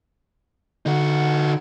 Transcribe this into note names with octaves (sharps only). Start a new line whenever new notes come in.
D3 D#4 F#4